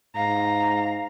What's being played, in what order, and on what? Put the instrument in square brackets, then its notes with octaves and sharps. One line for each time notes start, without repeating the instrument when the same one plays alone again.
[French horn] G#2 [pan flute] F5 [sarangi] A#5